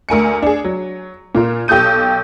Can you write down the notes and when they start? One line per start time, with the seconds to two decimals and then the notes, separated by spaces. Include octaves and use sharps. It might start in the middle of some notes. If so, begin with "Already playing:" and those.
0.09 D2 A#4 G#5 C#7
0.42 D4 G#4
0.64 F#3
1.35 A#2 F4 A#4
1.68 B1 G4 A4 D#6 G6 D#7